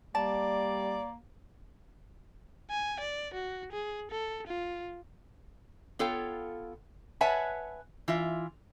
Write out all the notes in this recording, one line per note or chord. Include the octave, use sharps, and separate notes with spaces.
G3 A#3 D5 A5
G#5
D5
F#4
G#4
A4
F4
B3 F4 A4 C#5 F5 G5
B4 C#5 E5 F#5 G#5 A5
E3 F4 E5